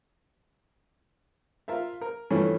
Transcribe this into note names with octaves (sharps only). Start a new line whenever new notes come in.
F4 A#4 E5 F5
A#4
G2 E3 F3 A3 C#4